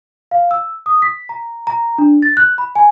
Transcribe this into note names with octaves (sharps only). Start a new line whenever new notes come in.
F5
E6
D#6
B6
A#5
A#5
D4
A6
F#6
B5
G#5